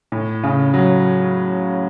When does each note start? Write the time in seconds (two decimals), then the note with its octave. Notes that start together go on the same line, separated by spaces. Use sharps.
0.12 A2
0.44 C#3
0.74 F#3